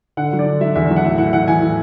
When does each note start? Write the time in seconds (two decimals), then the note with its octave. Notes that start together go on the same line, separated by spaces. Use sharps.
0.17 D3 F#5
0.33 F#3
0.39 D5
0.46 D3
0.61 F#3 E5
0.75 E2 E5
0.90 F#3
0.96 F#5
1.04 A2 E5
1.18 E3 F#5
1.33 E3 F#5
1.48 E3 G#5
1.61 A2